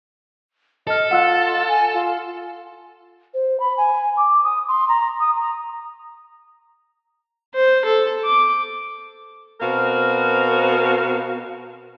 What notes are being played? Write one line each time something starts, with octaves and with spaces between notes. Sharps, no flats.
A4 D#5 A5 F6
F4 F#5 E6 F#6
G#5
F4
C5
B5
G#5
D6
D#6
C6
A#5
D#6
A#5
C5
A4
D6
B2 C4 F#4 A#4 F5